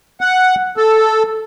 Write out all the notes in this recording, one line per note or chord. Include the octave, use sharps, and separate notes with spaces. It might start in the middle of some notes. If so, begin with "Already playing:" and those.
F#5
A4